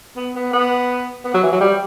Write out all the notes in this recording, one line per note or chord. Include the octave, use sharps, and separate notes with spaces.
B3
B3
B3
B3
F#3
E3
F#3
G3